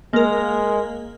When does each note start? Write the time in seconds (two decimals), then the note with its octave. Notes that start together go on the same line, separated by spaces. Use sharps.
0.13 G#3 A#3 A#4